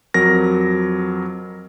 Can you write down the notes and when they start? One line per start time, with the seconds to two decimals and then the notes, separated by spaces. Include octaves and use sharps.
0.14 F2 F#3 A#4 A#6